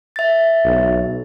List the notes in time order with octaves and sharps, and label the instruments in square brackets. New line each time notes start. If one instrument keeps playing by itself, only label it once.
[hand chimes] E5 A6
[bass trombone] B1